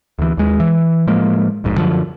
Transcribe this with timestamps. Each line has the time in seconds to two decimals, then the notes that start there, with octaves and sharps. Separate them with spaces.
0.19 D2 E3
0.37 D#2 G#3
0.60 E3
1.07 A2 F3 G#3 A#3
1.64 D1 A#1 G#2
1.78 F#2 D3 F3